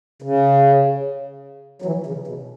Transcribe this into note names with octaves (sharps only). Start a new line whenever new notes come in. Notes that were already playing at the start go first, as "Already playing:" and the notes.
C#3
F#3
E3
C#3
B2